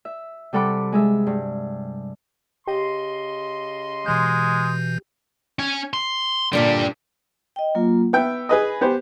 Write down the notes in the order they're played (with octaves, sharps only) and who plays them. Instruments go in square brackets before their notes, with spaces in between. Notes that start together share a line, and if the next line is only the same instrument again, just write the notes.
[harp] E5
C3 G3 A4 F#5 B5 D6
G#3 G#4 E5
G2
[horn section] C#3 D#5 C6 [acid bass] G4
[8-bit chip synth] B2 E3 G6 [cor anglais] G#3
[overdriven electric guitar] C#4 G#5
C6
[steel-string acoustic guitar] G2 A#2 D3 [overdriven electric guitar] G3 D4
[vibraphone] D#5 G5
F#3 A#3 F4
[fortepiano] B3 E5 G5 [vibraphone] E6
[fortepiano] G#4 B4 D#5 [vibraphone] G#5 B5
[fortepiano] B3 G4 C5